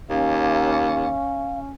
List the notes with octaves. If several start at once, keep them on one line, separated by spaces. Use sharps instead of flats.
D#2 C#4 F5